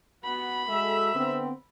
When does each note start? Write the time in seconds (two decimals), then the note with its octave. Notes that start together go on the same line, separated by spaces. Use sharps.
0.24 B3 F#4 B5
0.68 G#3 F#4 A4 E5 E6
1.15 D3 B3 C4